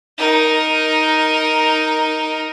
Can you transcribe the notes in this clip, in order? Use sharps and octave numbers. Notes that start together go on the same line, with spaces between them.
D#4 A#4